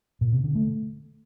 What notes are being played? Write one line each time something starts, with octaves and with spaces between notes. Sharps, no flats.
A#2
C3
D3
A3